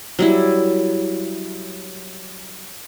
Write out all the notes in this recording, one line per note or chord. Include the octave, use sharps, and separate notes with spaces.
F#3 G3 E4